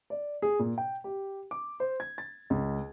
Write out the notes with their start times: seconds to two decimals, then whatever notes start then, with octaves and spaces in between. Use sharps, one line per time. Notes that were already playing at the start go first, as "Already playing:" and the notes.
0.10 D5
0.42 G#4
0.59 A#2
0.78 G5
1.04 G4
1.51 D6
1.80 C5
2.00 G#6
2.18 A6
2.50 C#2